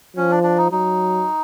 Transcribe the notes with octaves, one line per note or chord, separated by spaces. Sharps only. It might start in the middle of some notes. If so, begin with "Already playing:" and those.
F3 C#4
D4
D4
D#4
F#3 D#4